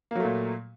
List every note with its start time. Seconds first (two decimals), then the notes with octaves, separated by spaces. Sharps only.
0.11 A#3
0.15 F#3
0.20 A3
0.24 A#2